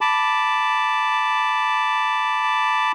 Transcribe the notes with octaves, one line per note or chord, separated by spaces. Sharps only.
A5 B5 D6